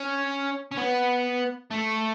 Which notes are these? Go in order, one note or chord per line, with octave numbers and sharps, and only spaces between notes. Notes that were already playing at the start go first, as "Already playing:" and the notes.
Already playing: C#4
C#4
B3
A3